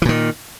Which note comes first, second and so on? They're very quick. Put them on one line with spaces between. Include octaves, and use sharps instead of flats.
E3 A#2 D#3